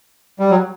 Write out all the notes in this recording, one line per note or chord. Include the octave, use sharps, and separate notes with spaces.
G3
F#3